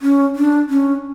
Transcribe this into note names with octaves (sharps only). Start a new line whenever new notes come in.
C#4
D4
C#4